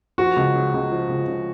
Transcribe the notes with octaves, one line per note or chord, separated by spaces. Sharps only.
F3 F#4
C#2
C#3
C#2
F3
C#2
C#3